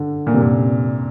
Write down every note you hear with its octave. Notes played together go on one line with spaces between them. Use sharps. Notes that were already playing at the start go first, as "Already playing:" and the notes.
Already playing: D3
A#2
C3
A#2